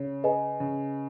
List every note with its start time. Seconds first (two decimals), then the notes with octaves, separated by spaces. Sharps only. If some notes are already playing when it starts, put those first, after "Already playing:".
Already playing: C#3 C#5
0.24 G#4 B4 D#5 G#5
0.60 C#3